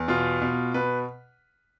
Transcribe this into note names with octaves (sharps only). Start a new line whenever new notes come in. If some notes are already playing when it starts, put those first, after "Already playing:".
Already playing: E2
B2 F4
B2
B2 B4